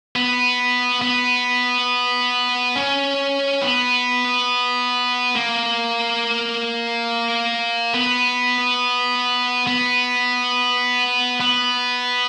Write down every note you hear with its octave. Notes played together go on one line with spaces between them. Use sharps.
B3
B3
C#4
B3
A#3
B3
B3
B3